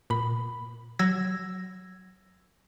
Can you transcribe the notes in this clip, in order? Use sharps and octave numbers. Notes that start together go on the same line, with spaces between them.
A#2 B5
F#3 E6 G#6 A#6